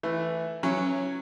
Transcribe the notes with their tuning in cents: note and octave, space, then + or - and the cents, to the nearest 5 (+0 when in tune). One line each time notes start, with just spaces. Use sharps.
E3 +5 A3 +0
F#3 +0 C#4 -10 E4 +30